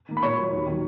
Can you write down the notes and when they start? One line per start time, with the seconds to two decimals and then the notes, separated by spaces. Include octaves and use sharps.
0.09 D#3 A#3
0.17 B5
0.22 A#2 C#5 C#6
0.37 F#3 A#3
0.52 D#2
0.67 D#3 F#3